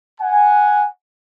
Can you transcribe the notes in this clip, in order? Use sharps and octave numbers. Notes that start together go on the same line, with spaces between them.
F#5 G#5